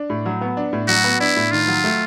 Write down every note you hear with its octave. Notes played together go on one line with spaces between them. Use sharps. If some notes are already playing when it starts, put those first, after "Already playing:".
Already playing: D4
A2
F#3
B3
D4
A2
F#3 F#4
B3
D4 E4
A2
D#3 F4
F#3
A3